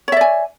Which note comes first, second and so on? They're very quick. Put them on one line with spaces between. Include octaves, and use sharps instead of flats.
C#5 E5 D5 G#5